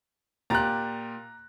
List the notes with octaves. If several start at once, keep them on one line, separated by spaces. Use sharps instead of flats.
A#2 G4 A#5 F#6 A6